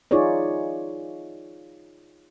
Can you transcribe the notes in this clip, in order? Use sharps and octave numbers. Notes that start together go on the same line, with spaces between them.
D#4 F4 G#4 C#5 D5